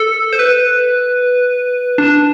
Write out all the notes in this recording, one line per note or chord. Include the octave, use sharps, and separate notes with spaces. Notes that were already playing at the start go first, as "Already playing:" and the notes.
Already playing: A4
C5
B4
D4